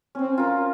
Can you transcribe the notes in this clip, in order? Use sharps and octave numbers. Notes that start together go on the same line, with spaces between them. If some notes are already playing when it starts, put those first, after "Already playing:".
C4 C#4
F4 A#4